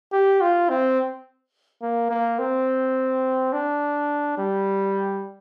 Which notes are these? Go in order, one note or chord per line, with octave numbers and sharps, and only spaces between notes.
G4
F4
C4
A#3
A#3
C4
D4
G3